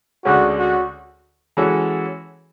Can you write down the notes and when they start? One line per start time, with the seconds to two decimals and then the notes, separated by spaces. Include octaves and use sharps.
0.25 D2 D3 G#3 C#4 F#4
0.58 F#4
1.57 E3 G#3 C#4 F#4 A4